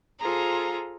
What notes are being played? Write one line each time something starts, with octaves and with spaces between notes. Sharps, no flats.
F4 G#4 A4 C5 A#5